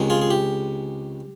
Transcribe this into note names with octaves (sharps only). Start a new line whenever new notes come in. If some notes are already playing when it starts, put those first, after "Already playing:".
Already playing: C#2 C3 D#3 G#3
F4 G#4
G#4
G4